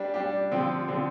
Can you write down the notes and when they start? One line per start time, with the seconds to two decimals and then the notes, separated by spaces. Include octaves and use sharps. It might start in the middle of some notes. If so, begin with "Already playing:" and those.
Already playing: G3 D4 G4
0.14 G3 D4 G4
0.51 D3 F3 C4 G4
0.88 D3 F3 C4 G4